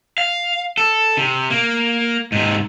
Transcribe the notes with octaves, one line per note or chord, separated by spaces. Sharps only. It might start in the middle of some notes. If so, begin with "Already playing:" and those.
F5
A4
C3
A#3
G#2 C3